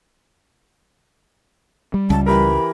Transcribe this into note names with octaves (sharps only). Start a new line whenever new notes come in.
G3
C#2 A5
E3 G4 A#4 B5